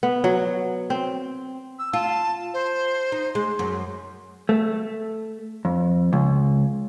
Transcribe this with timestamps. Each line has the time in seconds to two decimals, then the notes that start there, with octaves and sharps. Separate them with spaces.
0.03 B3
0.24 F#3
0.90 C4
1.79 E6
1.93 F4 A5
2.54 C5
3.12 D#4
3.35 G#3 C6
3.59 F#2
4.49 A3
5.65 F2
6.13 C#2